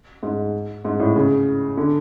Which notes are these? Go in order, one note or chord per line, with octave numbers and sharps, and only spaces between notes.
G#2
G#2
A2
C#3
D3